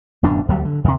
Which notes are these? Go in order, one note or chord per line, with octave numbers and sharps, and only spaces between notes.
D1 F#2 B2 D4
D2 F#3 G3
D3
D#2 C3